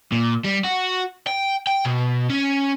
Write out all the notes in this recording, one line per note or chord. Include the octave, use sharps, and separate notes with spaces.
A#2
G3
F#4
G5
G5
B2
C#4